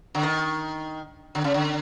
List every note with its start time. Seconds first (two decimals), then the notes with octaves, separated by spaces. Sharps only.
0.15 D3
0.23 D#3
1.35 D3
1.44 C#3
1.54 D3